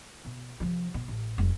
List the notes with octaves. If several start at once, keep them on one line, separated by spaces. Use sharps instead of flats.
B2
C3 F3
B2
A1
F1 F#3